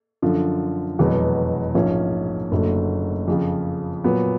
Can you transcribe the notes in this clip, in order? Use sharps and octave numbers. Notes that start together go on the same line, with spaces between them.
F#2 D3 F3
F1 E2 B2 F#3 B3
A#1 G#2 F3 A#3 C#4
F#1 F#2 D3 F#3 A3
F2 C#3 F3
A#2 F#3 B3